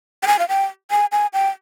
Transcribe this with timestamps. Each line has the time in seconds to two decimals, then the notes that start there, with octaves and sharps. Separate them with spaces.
0.23 G5
0.27 G#5
0.39 F5
0.49 G5
0.91 G#5
1.12 G#5
1.33 G5